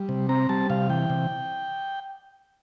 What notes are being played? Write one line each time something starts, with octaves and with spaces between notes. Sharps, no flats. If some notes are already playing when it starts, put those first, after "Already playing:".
Already playing: G3
C3
C4 A#5
G3 A5
C3 F5
E3 G5
C3